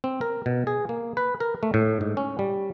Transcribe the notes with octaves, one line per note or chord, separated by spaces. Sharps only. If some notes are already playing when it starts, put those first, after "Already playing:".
C4
A#4
B2
G#4
A#3
B4
A#4
A3
A2
G#2
C#4
G3